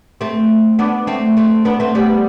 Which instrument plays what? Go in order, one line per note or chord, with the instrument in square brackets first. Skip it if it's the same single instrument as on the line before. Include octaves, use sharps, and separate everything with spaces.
[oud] A3 C4
B3 D4
A3 C4
A3 C4
B3 D4
A3 C4
G3 B3